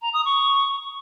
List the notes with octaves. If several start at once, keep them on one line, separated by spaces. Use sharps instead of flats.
A#5
D#6
C#6